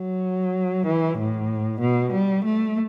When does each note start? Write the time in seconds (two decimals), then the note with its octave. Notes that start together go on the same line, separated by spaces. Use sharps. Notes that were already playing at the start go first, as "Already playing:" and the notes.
Already playing: F#3
0.87 E3
1.18 A2
1.81 B2
2.13 G3
2.45 A3